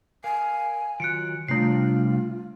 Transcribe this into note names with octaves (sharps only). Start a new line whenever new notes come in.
A#4 F5 G#5
D#3 F#3 F4 F#6 C#7 D7
C3 G3 A3 D4 F4 C7